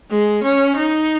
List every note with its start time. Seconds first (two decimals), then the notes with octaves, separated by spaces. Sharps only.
0.10 G#3
0.43 C#4
0.77 D#4